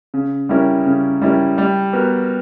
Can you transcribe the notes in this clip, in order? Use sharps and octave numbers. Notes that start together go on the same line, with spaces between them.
C#3
G3 C#4 E4 A#4
C#3
G3 C#4 E4 A#4
G3
B3 F#4 A#4